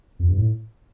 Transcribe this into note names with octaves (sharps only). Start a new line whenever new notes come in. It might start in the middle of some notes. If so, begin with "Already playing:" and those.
F2
G2
A2